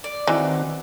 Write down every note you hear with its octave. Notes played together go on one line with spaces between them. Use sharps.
D5
D#3 E3 C4 F#4